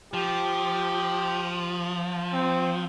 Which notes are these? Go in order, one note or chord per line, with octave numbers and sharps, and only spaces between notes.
F3 G4
C4